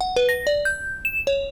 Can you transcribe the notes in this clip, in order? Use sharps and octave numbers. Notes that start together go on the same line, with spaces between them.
F#5
B4
A#6
D5
G6
E7
C#5